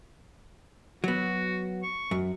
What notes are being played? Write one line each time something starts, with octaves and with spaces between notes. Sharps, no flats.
F#3 B3 F#4
C#6
F#2